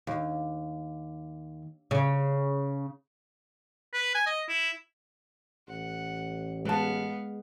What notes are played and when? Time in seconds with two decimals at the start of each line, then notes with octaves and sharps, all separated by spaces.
0.07 D#2
1.91 C#3
3.94 B4
4.15 G#5
4.26 D#5
4.49 E4
5.68 A1 F#5
6.65 G#3 B3 B4 F5 A5